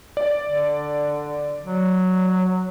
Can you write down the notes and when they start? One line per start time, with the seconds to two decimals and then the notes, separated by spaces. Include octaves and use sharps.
0.17 D5
0.46 D3
1.63 F#3